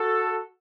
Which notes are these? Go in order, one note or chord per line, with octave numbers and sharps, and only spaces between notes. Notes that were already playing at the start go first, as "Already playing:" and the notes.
Already playing: F#4 A4